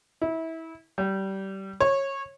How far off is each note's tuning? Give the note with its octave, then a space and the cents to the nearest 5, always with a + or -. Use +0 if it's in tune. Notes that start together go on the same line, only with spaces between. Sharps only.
E4 -25
G3 -20
C#5 -20